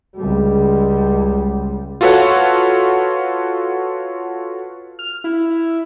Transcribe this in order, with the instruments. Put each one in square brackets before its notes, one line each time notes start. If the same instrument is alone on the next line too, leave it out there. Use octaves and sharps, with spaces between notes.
[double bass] C#2 G3
[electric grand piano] F4 F#4 A4 B4 C#5 F#5
[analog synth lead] F6
E4